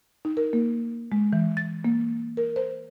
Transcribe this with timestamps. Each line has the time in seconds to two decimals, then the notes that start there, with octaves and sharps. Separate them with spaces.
0.25 D#4
0.37 A#4
0.53 A#3
1.12 G#3
1.33 E3
1.57 A6
1.85 A#3
2.37 A#4
2.56 C5